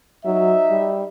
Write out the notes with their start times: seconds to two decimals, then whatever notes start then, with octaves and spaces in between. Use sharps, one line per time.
0.25 F#3 D#4 E5
0.70 G3